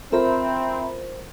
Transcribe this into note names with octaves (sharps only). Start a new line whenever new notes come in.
C4 F4 A#4 C5 E5 A#5 B5